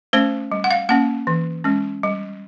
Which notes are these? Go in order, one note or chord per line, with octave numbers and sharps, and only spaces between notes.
A3 C#4 C5
G3
F#5
F5
A#3 C#4 F#5
E3
G#3 C#4
G3